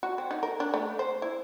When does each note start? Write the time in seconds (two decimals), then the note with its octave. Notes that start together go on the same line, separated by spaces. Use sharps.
0.03 F#4
0.18 C4
0.31 D#4
0.43 A#4
0.60 D4
0.74 A3
0.99 C5
1.22 E4